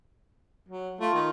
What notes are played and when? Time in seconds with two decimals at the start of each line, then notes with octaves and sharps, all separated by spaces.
0.68 F#3
1.00 A3 F4
1.13 D#3